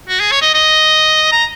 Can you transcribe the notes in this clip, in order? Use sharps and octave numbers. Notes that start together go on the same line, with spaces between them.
F#4
G#4
C#5
D#5
D#5
A#5